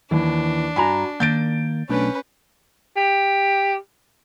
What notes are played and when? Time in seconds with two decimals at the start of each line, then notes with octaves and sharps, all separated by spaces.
0.11 D#2 E3 D4
0.76 G2 F#4 G#5 A#5 B5
1.20 D#3 A#3 G6 A6 D7
1.89 B1 A3 C#4 D4 B4
2.97 G4